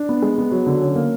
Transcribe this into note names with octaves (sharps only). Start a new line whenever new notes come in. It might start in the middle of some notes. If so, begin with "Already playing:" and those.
Already playing: D4
B3
G#3
B3
F#3
D3
C#4
A#3